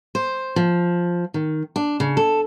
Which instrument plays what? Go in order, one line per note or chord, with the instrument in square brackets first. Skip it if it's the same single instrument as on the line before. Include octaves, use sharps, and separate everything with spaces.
[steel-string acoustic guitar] C5
F3
D#3
D4
C#3
A4